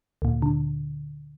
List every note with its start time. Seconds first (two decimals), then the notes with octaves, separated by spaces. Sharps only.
0.22 D2 A#2
0.42 D3